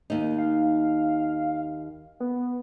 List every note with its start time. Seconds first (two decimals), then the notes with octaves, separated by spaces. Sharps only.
0.10 D#2 D#4
0.38 F5
2.20 B3